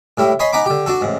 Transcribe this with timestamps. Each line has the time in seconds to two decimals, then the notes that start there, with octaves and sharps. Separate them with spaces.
0.18 A2 G3 E4
0.40 C#5 D#5 G#5 B5 C6
0.53 D#4 F#5 G#5 A#5 B5 D6
0.66 D3 G4
0.86 D4 F#4 A4
1.01 A1 G#2